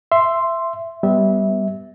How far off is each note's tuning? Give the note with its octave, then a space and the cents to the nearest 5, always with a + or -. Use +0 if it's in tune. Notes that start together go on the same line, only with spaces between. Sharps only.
E5 +15 C6 +0
G3 -5 B3 +0 E5 -20